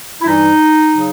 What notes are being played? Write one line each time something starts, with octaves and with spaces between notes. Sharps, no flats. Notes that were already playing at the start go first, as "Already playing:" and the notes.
E4
G2 E3 G3 D#4
C#3 F#3